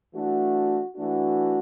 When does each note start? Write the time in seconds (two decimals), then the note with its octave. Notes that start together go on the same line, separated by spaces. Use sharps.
0.15 E3 A3 D4 F#4
0.96 E3 A3 D4 F#4